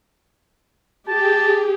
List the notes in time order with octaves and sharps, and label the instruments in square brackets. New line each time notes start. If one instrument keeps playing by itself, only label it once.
[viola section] G4 G#4 [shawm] A5